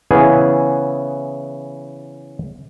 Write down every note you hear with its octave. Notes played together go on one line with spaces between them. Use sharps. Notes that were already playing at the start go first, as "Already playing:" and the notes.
C#3 E3 B3 E4 G#4